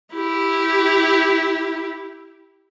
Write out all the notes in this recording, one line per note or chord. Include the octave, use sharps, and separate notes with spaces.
E4 G4